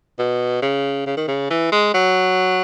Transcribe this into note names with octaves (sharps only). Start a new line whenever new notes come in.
B2
C#3
C#3
D#3
C#3
E3
G#3
F#3